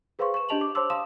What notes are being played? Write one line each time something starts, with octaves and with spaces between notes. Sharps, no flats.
G#4 B4 C5 F5 C6 C#6
C#6 E7
D4 G4 D#5 A5 F7 F#7
D6
C5 C#5 A5 C6 D6 E6
F5 A5 C6 D#6 E7